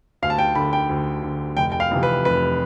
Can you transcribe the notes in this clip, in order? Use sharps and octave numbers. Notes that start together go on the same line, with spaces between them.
D2 F5
A5
G5
D3 B5
G5
D2
D3
F1 G5
G5
F5
F2 C3 E3
B4
F1 B4